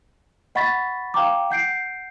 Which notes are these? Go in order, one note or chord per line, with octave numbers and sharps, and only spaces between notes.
D#5 F#5 B5 C#6 A6 B6
F5 G5 A#5 D6
F#5 G6 C7 D7